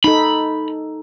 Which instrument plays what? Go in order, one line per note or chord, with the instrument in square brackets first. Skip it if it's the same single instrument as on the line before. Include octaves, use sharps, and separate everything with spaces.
[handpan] D#4 A4 [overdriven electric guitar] B5